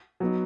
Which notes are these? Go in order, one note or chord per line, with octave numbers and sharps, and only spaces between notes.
F#3 B3 D#4